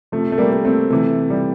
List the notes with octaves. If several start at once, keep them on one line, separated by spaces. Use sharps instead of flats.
C3 F3 A3
A3
G3 A#3
A#3
A3 C4
C3 E3 A3
G3